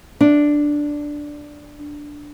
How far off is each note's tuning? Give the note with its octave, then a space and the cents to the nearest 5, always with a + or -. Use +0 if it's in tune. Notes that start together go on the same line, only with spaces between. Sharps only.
D4 +0